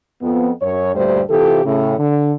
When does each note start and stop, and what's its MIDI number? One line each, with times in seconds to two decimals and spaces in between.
0.22 0.50 41
0.22 0.50 59
0.62 0.93 42
0.62 0.93 73
0.95 1.21 38
0.95 1.21 43
0.95 1.21 46
0.95 1.21 55
0.95 1.21 57
0.95 1.21 72
1.29 1.60 48
1.29 1.60 52
1.29 1.60 65
1.29 1.60 67
1.29 1.60 69
1.65 1.95 45
1.65 1.95 49
1.98 2.32 50